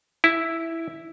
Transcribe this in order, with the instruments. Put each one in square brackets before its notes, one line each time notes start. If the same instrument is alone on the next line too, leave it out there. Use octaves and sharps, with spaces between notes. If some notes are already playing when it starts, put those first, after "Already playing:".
[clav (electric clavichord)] E4